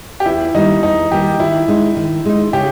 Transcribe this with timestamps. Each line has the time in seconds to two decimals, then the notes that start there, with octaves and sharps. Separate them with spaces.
0.20 G4
0.26 E2 E4
0.54 D#3 G3 A#3 D#4
0.83 E2 D#4
1.11 D#3 G3 A#3 G4
1.39 D#3 E4
1.68 G#3 D#4
1.97 D#3
2.25 G#3 D#4
2.53 C#3 G4